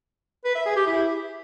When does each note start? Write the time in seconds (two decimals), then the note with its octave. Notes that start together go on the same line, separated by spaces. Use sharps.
0.45 B4
0.55 E5
0.66 G#4
0.76 G4
0.86 E4